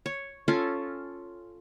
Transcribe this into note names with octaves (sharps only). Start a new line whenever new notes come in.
C#5
C#4 F4 A4